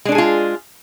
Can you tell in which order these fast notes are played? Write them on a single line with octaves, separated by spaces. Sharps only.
G#3 D4 A4 G#4 F4